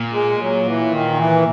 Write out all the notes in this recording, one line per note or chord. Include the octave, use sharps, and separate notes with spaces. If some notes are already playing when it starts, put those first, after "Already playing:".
Already playing: A#2
G#3
F#3
E3
D#3
E3